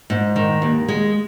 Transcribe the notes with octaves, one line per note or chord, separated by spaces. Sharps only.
G#2
D#3
D#2
G#3